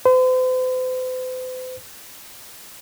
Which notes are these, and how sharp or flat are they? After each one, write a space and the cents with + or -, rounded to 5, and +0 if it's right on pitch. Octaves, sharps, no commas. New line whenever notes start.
C5 -45